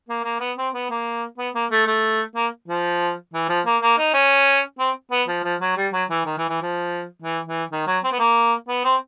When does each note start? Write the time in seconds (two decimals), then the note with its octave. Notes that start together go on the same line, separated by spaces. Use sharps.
0.09 A#3
0.24 A#3
0.40 B3
0.57 C4
0.74 B3
0.90 A#3
1.38 B3
1.54 A#3
1.71 A3
1.87 A3
2.36 A#3
2.68 F3
3.34 E3
3.49 F3
3.66 A#3
3.82 A#3
3.98 D#4
4.14 C#4
4.79 C4
5.11 B3
5.28 F3
5.44 F3
5.61 F#3
5.77 G3
5.93 F#3
6.10 E3
6.25 D#3
6.38 E3
6.49 E3
6.62 F3
7.22 E3
7.47 E3
7.72 D#3
7.87 F#3
8.04 C4
8.12 B3
8.19 A#3
8.68 B3
8.84 C4